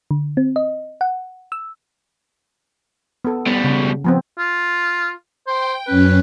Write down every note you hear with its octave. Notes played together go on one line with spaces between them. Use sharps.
D3
C4
D#5
F#5
E6
B3 A4
B2 G3
C#3
F3 B3 C4
F4
C5 G5
F#2 C#4 B4